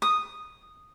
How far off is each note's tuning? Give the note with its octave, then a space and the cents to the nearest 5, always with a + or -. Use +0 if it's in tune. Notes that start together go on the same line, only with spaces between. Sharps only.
D#6 -5